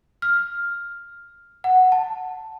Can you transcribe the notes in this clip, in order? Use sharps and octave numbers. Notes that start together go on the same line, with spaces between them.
F6
F#5
A5